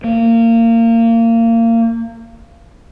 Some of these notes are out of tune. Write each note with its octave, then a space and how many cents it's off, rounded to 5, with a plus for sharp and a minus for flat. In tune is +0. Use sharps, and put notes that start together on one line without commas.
A#3 -25